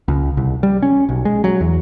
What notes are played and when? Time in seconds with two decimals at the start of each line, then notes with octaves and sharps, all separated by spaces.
0.08 C#2
0.37 C2
0.63 G3
0.82 C#4
1.09 B1
1.25 G#3
1.44 F#3
1.61 E2